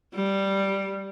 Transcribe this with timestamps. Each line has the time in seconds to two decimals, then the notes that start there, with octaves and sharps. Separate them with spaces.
0.15 G3